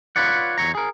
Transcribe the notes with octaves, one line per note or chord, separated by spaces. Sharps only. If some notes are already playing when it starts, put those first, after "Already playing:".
F4 B4 C#5 D5 F#5
E2 G#2 C#5 A#5
G#4 A#4